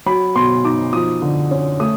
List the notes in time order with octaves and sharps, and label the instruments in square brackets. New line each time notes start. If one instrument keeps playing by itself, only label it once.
[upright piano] F#3 B5
B2 C6
D#4 D6
F3 D#6
D3
C#4
A3 D#6